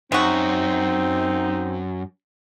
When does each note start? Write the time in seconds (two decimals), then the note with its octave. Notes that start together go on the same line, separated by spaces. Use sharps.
0.12 F#2 G#3 C4 D#4 F#4